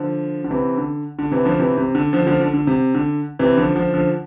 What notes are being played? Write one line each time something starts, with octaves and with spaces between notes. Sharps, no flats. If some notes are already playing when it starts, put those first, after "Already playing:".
Already playing: D3 F3
D3
C3 E3
D3
D3
C3 E3
D3 F3
C3 E3
C3
D3
D3 F3
D3 F3
D3
D3
C3
D3
C3 E3
D3 F3
D3 F3
D3 F3